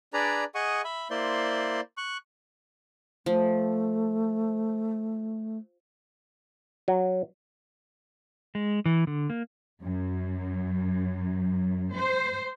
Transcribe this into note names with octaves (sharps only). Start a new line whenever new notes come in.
D4 G#4 B4 D5 A#5
G#4 D#5 F#5 C#6 D#6
E5 B5
A#3 E4 C5 D5 C6
C#6 F#6
F3 A3
F#3
G#3
E3
D3
A#3
F#2
C5